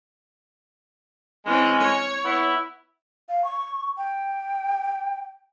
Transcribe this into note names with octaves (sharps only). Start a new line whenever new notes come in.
E3 G#3 C4 C#4
C#5
B3 E4
F5
C#6
G5